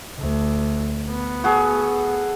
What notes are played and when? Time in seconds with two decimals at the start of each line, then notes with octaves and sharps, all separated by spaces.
0.18 D2
1.09 B3
1.44 F#4 G#4 A4